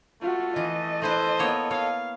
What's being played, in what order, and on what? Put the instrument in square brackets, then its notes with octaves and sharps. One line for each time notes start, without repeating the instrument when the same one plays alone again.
[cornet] A3 [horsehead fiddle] F4 F#4
[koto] E3 [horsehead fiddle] D#5
[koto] A3 E4 B4 [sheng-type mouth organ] A4 [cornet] C5
[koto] A#3 B3 C#5
[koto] C#5 [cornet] F5